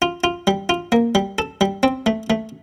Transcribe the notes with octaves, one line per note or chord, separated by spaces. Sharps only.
F4
F4
G3
F4
A#3
G3
A4
G3
C4
A3
A3